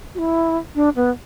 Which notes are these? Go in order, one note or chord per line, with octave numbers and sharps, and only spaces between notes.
F#4
E4
D4
B3